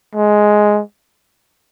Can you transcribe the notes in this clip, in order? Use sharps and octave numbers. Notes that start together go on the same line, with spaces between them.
G#3